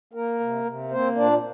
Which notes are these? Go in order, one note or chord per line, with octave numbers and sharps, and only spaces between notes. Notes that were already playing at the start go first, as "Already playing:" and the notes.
A#3 A#4
C3
C3
A#3 C4 C5
A#2 D4 D5